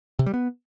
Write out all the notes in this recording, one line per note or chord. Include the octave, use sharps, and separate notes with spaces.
C3
G3
B3